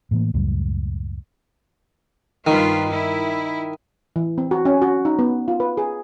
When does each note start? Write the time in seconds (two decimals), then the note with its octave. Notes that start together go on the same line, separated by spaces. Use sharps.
0.11 A2 E3 A#3
0.34 C#2 F#2 A2 G3
2.47 G2 D#3 F4 B4
2.89 E4
4.16 E3
4.38 C4
4.51 F#4
4.65 C#4
4.82 F#4
5.05 D#4
5.19 B3
5.48 F4
5.60 B4
5.77 G#4